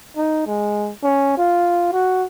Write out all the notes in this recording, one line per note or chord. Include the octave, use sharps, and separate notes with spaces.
D#4
G#3
C#4
F4
F#4